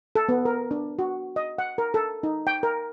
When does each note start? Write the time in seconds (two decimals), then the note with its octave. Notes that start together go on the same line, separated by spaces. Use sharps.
0.15 A4
0.29 B3
0.45 A#4
0.71 D4
0.99 F#4
1.36 D#5
1.58 F#5
1.78 A#4
1.94 A4
2.23 D#4
2.47 G5
2.63 A#4